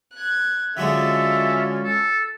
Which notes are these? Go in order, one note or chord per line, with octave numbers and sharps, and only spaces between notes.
F#6 G#6
D3 F#3 G#3 C#4 F4 A4 E5
A4